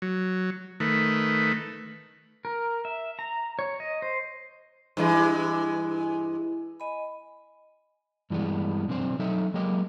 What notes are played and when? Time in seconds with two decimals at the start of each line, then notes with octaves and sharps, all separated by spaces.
0.02 F#3
0.80 D#3 A3 B4
2.45 A#4
2.85 E5
3.19 A#5
3.59 C#5
3.80 D#5
4.02 C5
4.97 G2 E3 G#3 E4
5.40 E4
6.80 D#5 G#5 B5
8.30 G2 E3 G3 G#3 B3
8.88 B1 C4 D4 C5
9.19 F#3 D#4 A4 D#5 E5
9.54 F#3 G#3 A#3 G4 D#5